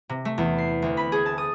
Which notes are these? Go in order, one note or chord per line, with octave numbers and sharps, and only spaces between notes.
C3
A3
E2
C7
D2
B5
G#4
A5
D#6